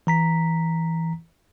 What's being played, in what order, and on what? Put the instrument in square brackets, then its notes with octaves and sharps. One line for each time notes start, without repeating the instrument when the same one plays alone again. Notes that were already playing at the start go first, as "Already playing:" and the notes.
[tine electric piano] E3 A#5 B6